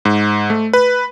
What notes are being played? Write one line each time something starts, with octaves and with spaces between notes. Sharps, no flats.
G#2
A3
B4